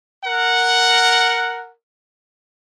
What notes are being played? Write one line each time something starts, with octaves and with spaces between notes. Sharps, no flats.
A#4 F#5